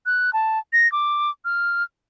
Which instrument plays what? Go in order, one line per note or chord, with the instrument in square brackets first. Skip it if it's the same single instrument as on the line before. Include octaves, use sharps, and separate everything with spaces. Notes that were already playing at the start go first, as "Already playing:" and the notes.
[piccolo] F#6
A5
A#6
D6
F6